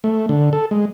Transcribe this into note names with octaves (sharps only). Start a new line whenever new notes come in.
A3
D3
A4
G#3